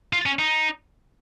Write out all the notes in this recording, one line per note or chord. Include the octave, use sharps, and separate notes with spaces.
F4
C#4
D#4